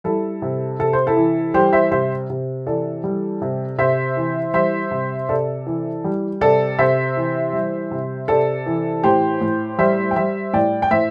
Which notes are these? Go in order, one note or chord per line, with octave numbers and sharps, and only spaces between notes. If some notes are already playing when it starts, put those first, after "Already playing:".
G3 E4 A4
C3
C3 A4
C5
E4 A4
E3
G3 G4 C5
C5 E5
C3 C5 E5
C3
E3 A4 D5
G3
C3
C3 C5 E5
E3
G3 C5 E5
C3
C3 A4 D5
E3
G3
C3 A4 D5
C3 C5 E5
E3
G3
C3
C3 A4 D5
E3
A2 G4 C5
A2
G3 C5 E5
G5
G3 C5 E5
A2 D5 G5
G5
A2 C5 E5